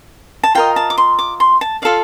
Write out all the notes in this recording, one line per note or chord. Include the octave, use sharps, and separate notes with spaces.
A5
F4 A#4 D#5 G5
A5
D6
C6
D6
C6
A5
F4 A4 D5 F5